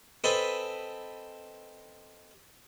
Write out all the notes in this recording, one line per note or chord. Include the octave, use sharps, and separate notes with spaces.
C4 A4 B4 D#5 G#5 A5